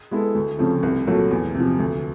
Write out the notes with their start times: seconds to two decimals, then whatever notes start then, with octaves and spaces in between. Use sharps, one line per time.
0.11 G#3 B3 E4 A4
0.35 D2
0.58 C#3 F3 A3 C4
0.83 C2
1.07 A#2 F#3 A3
1.31 E2
1.55 C3
1.60 F3
1.79 D2